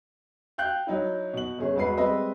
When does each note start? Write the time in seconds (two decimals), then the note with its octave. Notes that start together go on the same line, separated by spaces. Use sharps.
0.58 F5 G5 F#6 G6
0.87 F#3 D#4 E4
1.33 B2 F#7
1.58 G1 C#3 G#4 C#5
1.76 E1 G#3 F#4 B4 C7
1.97 G3 G#3 C4 B4 D#5 E5